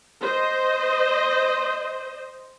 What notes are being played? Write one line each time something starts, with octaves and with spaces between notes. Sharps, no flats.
C5 D#5